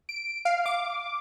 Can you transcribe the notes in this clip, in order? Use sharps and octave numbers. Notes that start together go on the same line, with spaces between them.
D7
F5
D6